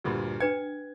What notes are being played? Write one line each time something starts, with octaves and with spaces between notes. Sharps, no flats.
D2 G2 A#2
D4 B4 G5 G#6